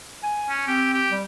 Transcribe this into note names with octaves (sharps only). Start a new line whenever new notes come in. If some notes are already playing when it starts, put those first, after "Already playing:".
G#5
C#4
C4 G4
G4
G3